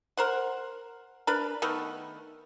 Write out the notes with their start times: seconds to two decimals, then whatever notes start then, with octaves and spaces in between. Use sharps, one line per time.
0.17 A#4 C5 F#5
1.27 D4 A#4 B4
1.62 D#3 A3 B3